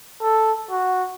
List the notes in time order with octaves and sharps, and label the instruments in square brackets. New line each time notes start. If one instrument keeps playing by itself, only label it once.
[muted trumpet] A4
F#4